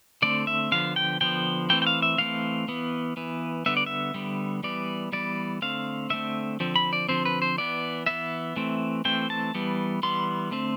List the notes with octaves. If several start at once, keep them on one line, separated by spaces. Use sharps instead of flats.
D3 A3 C4 D5
E5
D3 F3 B3 F5
G5
D3 F3 B3 G5
E3 A3 C4 G5
G5
F5
E5
E3 A3 C4 F5
E3 B3
E3 B3
D3 G3 B3 E5
D5
E5
D3 G3 B3
E3 G3 B3 D5
E3 G3 B3 D5
D3 A3 C4 F5
D3 A3 C4 E5
D3 F3 C4
B5
D5
D3 F3 C4 C5
B4
C5
E3 B3 D5
E3 B3 E5
E3 A3 C4
E3 A3 C4 G5
A5
E3 G3 B3
E3 G3 B3 C6
D3 A3 C4